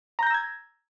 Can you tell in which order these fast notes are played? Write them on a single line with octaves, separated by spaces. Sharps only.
A#5 G6 A#6 E6 G#6